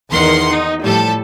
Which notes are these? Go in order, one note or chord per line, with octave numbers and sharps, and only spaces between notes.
E2 D#3 A#4 F#5 C6 C7
D#4
A2 F3 G3 A4 A5